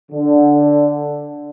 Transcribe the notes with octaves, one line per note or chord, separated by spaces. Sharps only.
D3